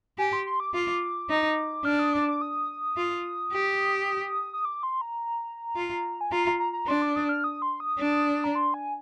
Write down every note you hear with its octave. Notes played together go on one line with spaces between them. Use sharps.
G4 G#5
C6
C6
D6
F4 D6
D#4
D4 F6
D#6
D6
D6
D#6
F4
G4
D#6
D6
C6
A#5
F4
G#5
F4 A#5
A#5
A#5
A#5
D4 C6
D6
D#6
F6
D#6
C6
D#6
D4
A#5
C6
G#5